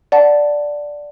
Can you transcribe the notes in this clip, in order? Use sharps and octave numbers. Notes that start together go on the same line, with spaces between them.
D5 F#5 A5